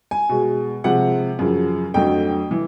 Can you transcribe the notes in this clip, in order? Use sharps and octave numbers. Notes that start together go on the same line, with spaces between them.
G#5
B2 G#3
C3 F3 G#3 F#5
F#2 C#3 F3
F2 D3 F#3 A3 G5
E3